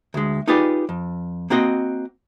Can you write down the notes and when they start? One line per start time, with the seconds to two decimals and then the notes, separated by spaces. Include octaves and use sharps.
0.14 D2 G#3
0.47 D#4 F4 G4 G#4 B4 D5
0.89 F2
1.50 A#3 C4 F#4 D#5